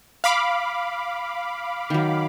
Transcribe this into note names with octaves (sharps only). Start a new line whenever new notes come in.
F5 B5 D6
D#3 F#3